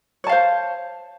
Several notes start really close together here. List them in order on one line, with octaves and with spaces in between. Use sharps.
C#5 A5 F5 C5